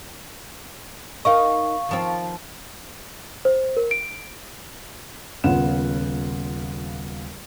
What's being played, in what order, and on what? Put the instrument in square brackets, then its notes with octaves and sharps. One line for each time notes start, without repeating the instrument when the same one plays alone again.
[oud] D#4 A#4 D#5 [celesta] F5 C#6
[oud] D#3 F3 C4
[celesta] C5
A#4
D7
[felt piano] D#1 C#3 B3 F4 F#5 E7